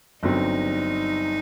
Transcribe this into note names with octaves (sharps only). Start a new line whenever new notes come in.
G1 G2 F#3 C4 D#4